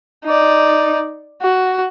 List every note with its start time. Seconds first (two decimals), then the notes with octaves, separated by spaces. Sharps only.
0.25 D#4 D5
1.42 F#4